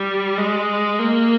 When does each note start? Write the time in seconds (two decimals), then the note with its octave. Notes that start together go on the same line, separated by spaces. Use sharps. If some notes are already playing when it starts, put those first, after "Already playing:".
Already playing: G3
0.38 G#3
0.99 A#3